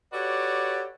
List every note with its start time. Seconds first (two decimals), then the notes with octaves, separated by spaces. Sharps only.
0.13 F#4 G4 A4 B4 C#5 D5